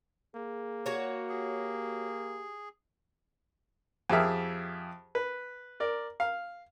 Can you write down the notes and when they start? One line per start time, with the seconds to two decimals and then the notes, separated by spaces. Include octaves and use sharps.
0.35 A#3 G#4
0.86 F#4 C#5
1.29 G4 G#4
4.10 F2 G4 G#4 E5 F6
5.15 B4
5.80 A#4 D5
6.20 F5